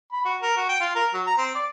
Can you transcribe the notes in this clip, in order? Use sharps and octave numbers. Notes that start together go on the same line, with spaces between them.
B5
F#4
A#4
F#4
G5
F4
A#4
F#3
A#5
C4
D5